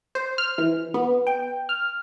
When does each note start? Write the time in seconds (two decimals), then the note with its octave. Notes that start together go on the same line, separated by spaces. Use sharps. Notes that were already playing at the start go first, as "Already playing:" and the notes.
0.15 C5
0.38 F6
0.58 E3
0.94 B3
1.27 G5
1.69 F6